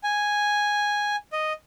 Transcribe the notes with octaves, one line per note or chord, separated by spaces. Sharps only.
G#5
D#5